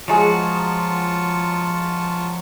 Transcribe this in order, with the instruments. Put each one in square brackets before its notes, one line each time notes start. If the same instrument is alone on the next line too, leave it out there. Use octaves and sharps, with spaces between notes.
[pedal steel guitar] F3 F#4 [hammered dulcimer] F#3 G#3 G#4 [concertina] F4 A5 C#6